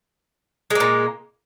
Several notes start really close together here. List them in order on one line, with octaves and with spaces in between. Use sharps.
G#3 A#3 A#2